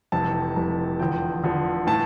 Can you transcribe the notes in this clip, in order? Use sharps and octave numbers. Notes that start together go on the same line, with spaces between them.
F1 F2 C3 E3 A5
F1 F2 C3 E3
E2 D3 F3 G5
E2 D3 F3
A2 E3 A5